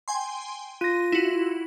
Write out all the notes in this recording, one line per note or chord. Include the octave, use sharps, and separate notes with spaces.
G5 G#5 C6
F4 A#6 D#7
E4 F#4